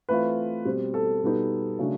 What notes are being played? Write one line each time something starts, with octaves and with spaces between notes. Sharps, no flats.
E3 A3 C4 F4 B4
B2 G3 C4
A4
B2 G3 B3 D#4
C#3 F#3 A3 D4